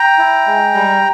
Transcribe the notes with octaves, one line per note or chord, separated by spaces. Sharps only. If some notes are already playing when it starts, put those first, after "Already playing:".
Already playing: G5 A#5
E4
G#3
G3